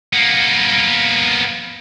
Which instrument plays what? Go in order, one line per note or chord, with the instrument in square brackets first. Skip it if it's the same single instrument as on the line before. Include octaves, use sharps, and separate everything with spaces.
[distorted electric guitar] A#3 B3